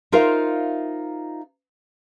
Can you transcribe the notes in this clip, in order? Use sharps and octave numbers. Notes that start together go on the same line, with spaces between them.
D#4 F4 A#4 C5 E5 F5